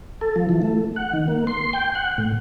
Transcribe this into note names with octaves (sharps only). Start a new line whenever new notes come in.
A4
F3
E3
A3
F#5
D#3
A#3
C6
G5
F#5
A2